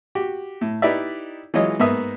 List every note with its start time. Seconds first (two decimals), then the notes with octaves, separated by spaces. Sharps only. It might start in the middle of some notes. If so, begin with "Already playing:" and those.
0.15 F#4 G4
0.61 A2
0.82 D#4 E4 G4 B4 D5 E5
1.54 E3 F#3 G#3 F4 C#5 D#5
1.80 G#2 A#3 B3 E5 D#6